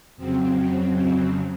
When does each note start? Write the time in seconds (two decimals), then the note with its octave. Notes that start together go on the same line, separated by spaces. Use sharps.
0.17 F2 C#3 F#3 C4
0.93 C4